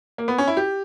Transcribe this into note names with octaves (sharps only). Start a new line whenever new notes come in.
A#3
B3
C#4
E4
G4